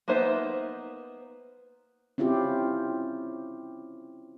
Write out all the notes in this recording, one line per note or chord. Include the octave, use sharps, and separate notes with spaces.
A#3 B3 D#4 C5 E5
C4 C#4 E4 F4 G4